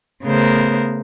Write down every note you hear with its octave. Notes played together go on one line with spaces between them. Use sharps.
C#3 A3 B3 A#4 C5